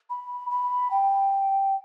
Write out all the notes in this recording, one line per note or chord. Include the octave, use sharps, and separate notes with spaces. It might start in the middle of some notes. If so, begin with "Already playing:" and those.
B5
B5
G5